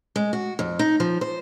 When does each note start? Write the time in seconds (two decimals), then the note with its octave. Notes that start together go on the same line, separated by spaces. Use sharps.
0.16 G#3
0.33 F#4
0.59 F2
0.79 D#4
1.00 F3
1.21 C5